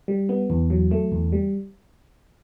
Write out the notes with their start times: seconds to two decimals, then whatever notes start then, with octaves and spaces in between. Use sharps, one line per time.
0.08 G3
0.29 B3
0.50 E2
0.70 F#3
0.91 A3
1.12 E2
1.32 G3